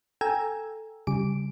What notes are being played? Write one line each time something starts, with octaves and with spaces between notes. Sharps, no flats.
A4 G5 G#5 A#5 E6 G#6
C#3 G3 D7